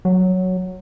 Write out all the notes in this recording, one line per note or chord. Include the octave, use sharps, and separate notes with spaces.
F#3